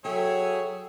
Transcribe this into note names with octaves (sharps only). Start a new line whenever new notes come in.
F#3 G#4 A4 C#5 E5 G5